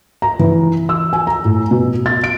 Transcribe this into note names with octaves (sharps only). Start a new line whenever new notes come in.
A#5
E3
E6
G#5
A#5
A2
B2
A6
D7